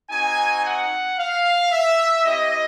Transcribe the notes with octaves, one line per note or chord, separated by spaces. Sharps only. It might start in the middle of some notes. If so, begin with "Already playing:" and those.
C4 D#4 F#4 G#5
F#5
F5
E5
C4 E4 G4 D#5